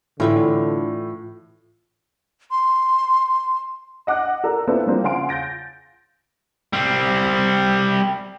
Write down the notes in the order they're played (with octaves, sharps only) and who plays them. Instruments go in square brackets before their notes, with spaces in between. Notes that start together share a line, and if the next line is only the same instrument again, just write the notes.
[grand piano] A2 [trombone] D3 [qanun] E3 A3 B4 [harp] F4
[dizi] C6
[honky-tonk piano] D#5 F#5 D6 F#6
A4 A#4 D5 A#5
B3 C4 D4 E4 F4 A4
E3 F3 G3 A#3 C4 D4
C#3 F5 F#5 G#5 C6 D7
G6 A6 A#6 D7
[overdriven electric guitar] G3 C4